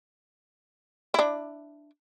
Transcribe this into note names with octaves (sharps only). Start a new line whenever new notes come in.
D4 E4